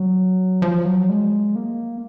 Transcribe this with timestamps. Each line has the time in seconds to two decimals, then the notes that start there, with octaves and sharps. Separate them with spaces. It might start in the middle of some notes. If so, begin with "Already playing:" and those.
Already playing: F#3
0.62 F3
0.85 F#3
1.09 G#3
1.56 A#3